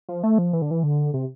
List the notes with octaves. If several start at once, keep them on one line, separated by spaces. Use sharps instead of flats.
F3
A3
F3
E3
D3
E3
D3
C3